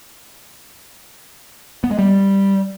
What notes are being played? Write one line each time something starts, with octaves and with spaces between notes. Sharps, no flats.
B3
G#3
G3